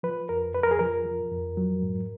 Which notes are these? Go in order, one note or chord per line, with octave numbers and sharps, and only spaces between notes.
F3 B4
F2 A#4
F2 B4
A#4
G#4
F3 A#4
F3
F2
F#3
G#2